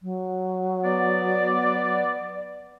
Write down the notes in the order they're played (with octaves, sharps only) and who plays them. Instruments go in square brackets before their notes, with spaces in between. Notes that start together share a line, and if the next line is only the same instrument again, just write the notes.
[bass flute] F#3
[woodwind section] B3 D5